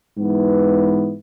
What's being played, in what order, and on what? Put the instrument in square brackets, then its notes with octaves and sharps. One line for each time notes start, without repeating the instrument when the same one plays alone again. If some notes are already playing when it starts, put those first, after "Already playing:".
[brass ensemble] G#2 E3 B3